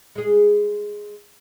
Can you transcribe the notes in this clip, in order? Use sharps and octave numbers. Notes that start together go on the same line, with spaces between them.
G#3 G#4